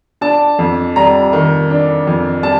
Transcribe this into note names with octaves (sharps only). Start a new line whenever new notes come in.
D4 A5
F2
G3 A#5
D#3
D4
F2
G3 A5